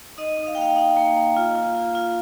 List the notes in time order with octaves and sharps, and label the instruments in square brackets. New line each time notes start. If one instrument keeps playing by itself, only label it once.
[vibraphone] D#4 D#5
D#4
F5
G5
A#3 F5
D#4
A#3
A#3
F4
F4
F4
F4